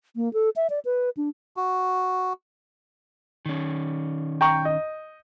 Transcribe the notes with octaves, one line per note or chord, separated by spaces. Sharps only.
A#3
A4
E5
D5
B4
D4
F#4
D#3 C#4
G5 A#5 C#6
D#5